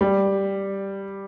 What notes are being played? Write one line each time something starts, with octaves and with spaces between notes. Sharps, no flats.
G3